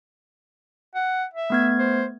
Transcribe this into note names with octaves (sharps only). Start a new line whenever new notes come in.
F#5
E5
A3 B3 G#6
C5